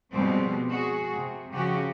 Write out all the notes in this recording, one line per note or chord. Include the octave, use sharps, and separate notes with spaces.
B2 F3 G3 G#3 C4
F#4 G#4
C3
C#3 F3 C#4 F#4 G4